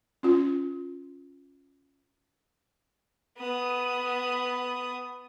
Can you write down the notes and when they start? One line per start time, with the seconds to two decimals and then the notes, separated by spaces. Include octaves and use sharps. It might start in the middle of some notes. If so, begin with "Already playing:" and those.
0.23 C#4 F4
3.38 B3 D#6